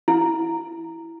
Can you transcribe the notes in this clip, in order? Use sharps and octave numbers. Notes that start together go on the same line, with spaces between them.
E4